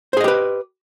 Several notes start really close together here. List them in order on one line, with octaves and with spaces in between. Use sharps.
C5 G#4 D#5 G4 B4